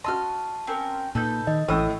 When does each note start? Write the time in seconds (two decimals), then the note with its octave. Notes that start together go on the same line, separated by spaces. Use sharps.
0.04 F#4 D#5 A5 C6 E6 F6
0.67 C4 C#4 A#4
1.15 A#2 D#4 A4 B4 A5 G6
1.47 D#3 D#5
1.68 A1 A2 E3 D#6 E6